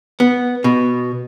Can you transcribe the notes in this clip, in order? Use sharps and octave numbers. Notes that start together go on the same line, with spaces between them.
B3
B2